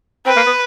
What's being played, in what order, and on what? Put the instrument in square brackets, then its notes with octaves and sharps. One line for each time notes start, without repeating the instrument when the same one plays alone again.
[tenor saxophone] C4 [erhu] B4
[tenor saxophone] A#3
B3